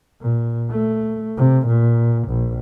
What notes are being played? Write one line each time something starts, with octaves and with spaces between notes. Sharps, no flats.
A#2
A3
C3
A#2
A#1